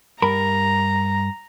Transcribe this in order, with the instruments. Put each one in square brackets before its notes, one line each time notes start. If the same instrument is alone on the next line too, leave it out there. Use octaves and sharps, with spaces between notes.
[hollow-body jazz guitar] G2 A#4 B5 [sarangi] A#5